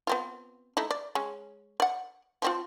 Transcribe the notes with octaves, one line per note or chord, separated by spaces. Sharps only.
B3 C4 F4
A3 D#4 E4
D5
G#3 C#4
D5 F#5
F3 C4 F4